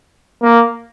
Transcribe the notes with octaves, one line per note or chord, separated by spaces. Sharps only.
A#3